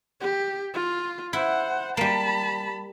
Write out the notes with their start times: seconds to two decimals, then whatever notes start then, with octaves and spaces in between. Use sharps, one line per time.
0.20 G4
0.74 F4
1.33 E4 C5 F#5
1.97 G3 A#3 A5 B5